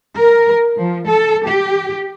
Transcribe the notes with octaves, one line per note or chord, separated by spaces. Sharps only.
A#4
F3
A4
G4